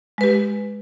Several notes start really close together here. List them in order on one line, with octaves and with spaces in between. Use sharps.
G#3 B4 G4